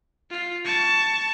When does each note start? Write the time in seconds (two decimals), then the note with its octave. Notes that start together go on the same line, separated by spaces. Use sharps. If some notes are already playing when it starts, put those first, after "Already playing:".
0.30 F4
0.65 A5 C#6